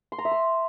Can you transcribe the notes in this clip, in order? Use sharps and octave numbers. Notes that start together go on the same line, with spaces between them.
C6
A#5
E5
C6